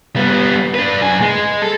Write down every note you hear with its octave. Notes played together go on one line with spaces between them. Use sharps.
G3 B3
D4 B4
F#2 G#5
G#3
A4